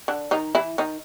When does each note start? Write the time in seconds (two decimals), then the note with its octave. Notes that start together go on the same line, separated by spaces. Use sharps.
0.08 D3 D4
0.31 D#3 D#4
0.55 E3 E4
0.78 D#3 D#4